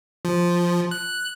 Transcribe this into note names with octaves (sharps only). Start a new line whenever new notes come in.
F3
F#6